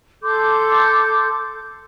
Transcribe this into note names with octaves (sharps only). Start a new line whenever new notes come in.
A4 C6 D6 G6